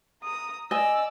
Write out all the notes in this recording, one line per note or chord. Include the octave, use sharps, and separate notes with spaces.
A#5 D#6
D5 D#5 G#5 E6